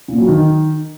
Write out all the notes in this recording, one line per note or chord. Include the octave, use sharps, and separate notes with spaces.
A#2
F#3
D#3